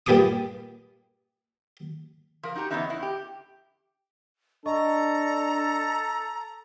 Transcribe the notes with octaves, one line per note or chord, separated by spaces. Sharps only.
G2 A#2 G4 G#4 D6 D#6
F3 A#4
D#4 F#4 G4 A#5
E2 G3 B3 C#4 D#4 E5
E2 E4
G4
D4 A4 D#5 A#5 C#6